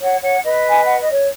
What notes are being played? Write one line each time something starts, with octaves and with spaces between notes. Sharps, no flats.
C#5 F#5
C#5 F#5
B4 D#5
G#5
F#5
D#5
C#5